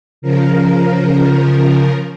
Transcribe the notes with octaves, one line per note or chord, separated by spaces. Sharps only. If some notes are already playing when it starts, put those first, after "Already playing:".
C#3 F3 A#4